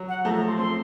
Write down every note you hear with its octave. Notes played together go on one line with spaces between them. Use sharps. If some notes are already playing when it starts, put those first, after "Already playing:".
Already playing: F#3
F#5
F3 A3 A#5
A#5
C6
A3 C4 C6